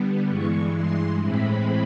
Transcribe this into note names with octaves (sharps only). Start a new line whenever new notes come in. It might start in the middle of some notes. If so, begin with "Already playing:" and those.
Already playing: D3 G3 B3
G2 E3 G#3 C#6
C6
A2 E3 G#3 C4 B5